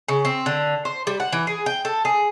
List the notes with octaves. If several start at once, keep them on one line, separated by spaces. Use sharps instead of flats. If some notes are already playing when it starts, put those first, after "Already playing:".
C#3
C4
D3
C5
G3
F#5
E3
G#4
G5
A4
G#4